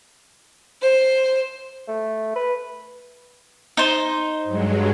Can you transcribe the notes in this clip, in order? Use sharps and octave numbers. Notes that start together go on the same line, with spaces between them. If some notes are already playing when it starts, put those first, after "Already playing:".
C5
A3
B4
D#4 C5
G2 F#3 G#3